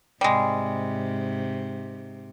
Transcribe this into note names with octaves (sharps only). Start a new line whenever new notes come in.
G#2 C3 G3 G#3